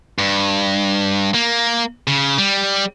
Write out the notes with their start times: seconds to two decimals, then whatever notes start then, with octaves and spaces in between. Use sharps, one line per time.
0.19 G2
1.34 A#3
2.08 C#3
2.38 G3